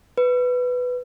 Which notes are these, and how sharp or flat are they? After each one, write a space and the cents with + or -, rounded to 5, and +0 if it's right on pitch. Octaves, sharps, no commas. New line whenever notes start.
B4 +5